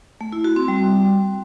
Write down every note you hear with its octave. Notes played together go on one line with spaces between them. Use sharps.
A3
E4
F#4
C4
G3